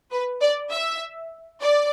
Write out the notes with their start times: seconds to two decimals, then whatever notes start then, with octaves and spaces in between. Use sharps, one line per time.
0.11 B4
0.41 D5
0.71 E5
1.62 D5